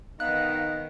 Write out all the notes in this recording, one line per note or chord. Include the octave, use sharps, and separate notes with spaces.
D#3 B3 D#4 F5 F#6